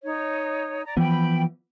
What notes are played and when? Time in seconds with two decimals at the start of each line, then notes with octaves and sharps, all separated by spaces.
0.03 D#4 C#5
0.85 D5 A#5
0.97 E3 F3 B3 G5 B5